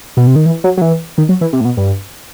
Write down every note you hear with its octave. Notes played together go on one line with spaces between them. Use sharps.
B2
C3
D#3
E3
F#3
F#3
E3
D#3
F#3
E3
C3
A2
B2
G2